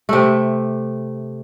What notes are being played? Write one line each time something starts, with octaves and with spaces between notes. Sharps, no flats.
C3 A3